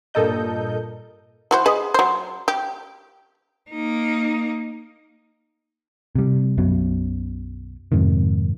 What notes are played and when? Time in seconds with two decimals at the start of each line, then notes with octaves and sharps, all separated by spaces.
0.14 G2 A#2 A4 A#4 D#5 G6
1.51 E3 F#4 C5
1.66 G#4 B4 D#5
1.94 F#3 C5
2.48 G4
3.70 A#3 D#4
6.15 C3 G3
6.58 B1 F#2 B2 F#3
7.92 F2 G#2 C3 D#3